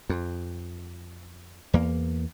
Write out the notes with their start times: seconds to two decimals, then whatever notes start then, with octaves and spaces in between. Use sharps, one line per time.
0.09 F2
1.73 E2 A#3